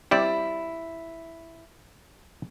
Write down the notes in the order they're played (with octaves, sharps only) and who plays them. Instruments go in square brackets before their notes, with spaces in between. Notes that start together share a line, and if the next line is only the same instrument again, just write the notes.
[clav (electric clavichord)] G3 C4 D5 [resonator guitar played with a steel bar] E4